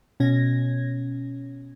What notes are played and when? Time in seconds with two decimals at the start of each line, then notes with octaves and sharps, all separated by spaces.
0.20 B2 C#4 G#6 A#6